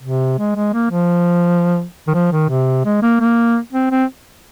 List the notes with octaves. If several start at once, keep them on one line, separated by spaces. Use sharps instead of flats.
C3
G#3
G#3
A#3
F3
D#3
F3
D#3
C3
G#3
A#3
A#3
C4
C4